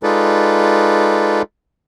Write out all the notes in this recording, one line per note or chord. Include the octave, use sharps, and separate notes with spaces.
G#3 D#4 F4 A4 B4 D5